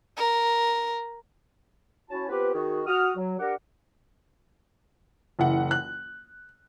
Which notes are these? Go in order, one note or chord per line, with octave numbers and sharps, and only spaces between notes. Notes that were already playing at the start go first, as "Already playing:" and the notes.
A#4
C#4 E4 F#4 A5
B3 C4 F4 G4 B4
D#3 F#4 G#4
F#4 D#6 F6
F#3
D4 G4 A#4 F#5
F#1 E3 F#5
F#6